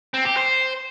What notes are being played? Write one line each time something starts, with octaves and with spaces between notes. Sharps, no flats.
C4
G4
C5